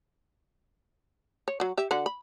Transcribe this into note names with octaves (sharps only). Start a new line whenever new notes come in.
C#5
F#3 F#4
G4 E5
D3 F#4 F#5
B5